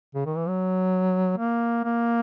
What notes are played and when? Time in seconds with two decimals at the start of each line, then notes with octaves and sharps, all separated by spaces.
0.15 C#3
0.26 D#3
0.36 E3
0.48 F#3
1.38 A#3
1.84 A#3